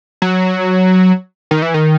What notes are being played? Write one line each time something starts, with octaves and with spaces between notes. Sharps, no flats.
F#3
D#3
E3
D#3